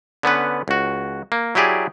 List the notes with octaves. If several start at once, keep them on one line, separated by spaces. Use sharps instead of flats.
D3 B3 C#4 B4
C#2 F#4
A#3
F#3 E4 G4 G#4 D5